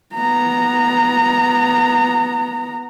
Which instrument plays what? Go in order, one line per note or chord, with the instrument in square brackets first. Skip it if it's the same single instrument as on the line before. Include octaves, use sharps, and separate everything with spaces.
[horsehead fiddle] B3 A#5